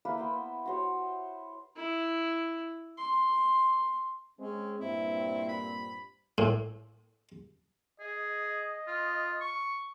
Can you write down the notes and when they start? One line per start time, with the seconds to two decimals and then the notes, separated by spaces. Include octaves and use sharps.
0.05 A#3 E4 G4 B4
0.18 B3 C5 G5
0.66 F#4 G4 C5 C#5
1.76 E4
2.98 C6
4.39 G#3 C4 C#4
4.80 G2 A#2 C4 E4
5.49 B5
6.38 A2
8.00 G#4 D#5
8.88 F4
9.41 C#6